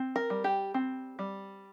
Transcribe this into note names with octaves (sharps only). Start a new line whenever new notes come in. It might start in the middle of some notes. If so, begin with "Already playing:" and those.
Already playing: C4
A#4
G3
G4
C4
G3